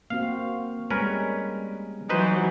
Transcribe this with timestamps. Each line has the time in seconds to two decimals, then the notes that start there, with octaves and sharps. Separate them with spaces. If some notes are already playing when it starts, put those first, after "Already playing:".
0.10 A#3 C4 F#4 F5
0.90 G3 G#3 C#4 A#4 B4
2.09 E3 F#3 D#4 B4 C5